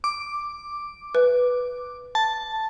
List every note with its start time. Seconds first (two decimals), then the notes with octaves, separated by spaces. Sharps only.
0.04 D6
1.15 B4
2.15 A5